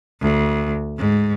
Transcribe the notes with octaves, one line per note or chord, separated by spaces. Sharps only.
D2
G#2